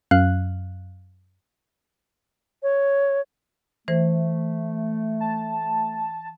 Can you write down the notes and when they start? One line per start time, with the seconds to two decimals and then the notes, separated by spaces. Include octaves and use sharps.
0.11 F#2 F5 F#6
2.63 C#5
3.88 E3 A3 C5
5.20 A5